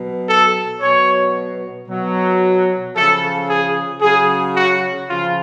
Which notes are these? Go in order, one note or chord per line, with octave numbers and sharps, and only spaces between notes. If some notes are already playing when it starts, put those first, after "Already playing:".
Already playing: B2 F#3
A4
B2 F#3 C#5
B2 F#3
C#3 F3 A4
G#4
C#3 F#3 G#4
F#4
C#3 F3 F4